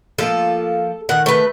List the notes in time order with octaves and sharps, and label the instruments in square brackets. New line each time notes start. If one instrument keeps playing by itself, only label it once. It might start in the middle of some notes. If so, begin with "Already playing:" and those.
[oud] F3 A#3 F4 [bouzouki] A4
[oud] D#3 F#4 A#4 [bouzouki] F#5
[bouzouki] A3 B4